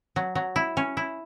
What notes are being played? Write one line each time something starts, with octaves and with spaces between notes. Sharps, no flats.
F#3
F#3
E4
C#4
E4